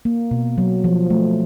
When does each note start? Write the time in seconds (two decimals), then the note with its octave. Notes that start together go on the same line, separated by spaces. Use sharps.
0.05 A#3
0.31 B2
0.58 F#3
0.84 F3
1.10 A3